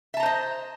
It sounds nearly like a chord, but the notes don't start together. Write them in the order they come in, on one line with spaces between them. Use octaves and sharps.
E5 A5 A#5 C5 D#5